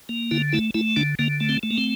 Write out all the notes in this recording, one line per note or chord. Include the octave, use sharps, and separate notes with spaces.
A#3
D3 E4
A3 E4
A3 E4
D3 D4
D3 A#3
A3
C4
A3
A#3
C4